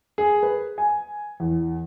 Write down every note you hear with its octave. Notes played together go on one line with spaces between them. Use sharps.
G#4
B4
G#5
E2